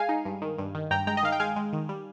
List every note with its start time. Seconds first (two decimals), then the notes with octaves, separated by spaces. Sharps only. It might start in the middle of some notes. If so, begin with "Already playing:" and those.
Already playing: G#3 F5 G#5
0.09 D#4
0.25 G2
0.42 D#3
0.58 G2
0.75 D#3
0.91 G2 G5 A#5
1.07 G#3 G5 A#5
1.17 D#5
1.23 D#3 F5
1.32 G5
1.40 G#3 F5 G#5
1.56 G#3
1.73 D#3
1.89 G3